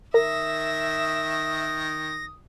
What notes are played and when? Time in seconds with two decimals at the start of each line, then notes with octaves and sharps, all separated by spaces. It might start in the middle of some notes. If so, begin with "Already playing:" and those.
0.14 D#3 A#4 E5 D#6 A#6